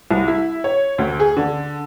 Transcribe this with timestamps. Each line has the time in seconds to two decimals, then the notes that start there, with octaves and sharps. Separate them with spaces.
0.11 C2
0.28 E4
0.64 C#5
0.98 D2
1.20 G#4
1.37 D3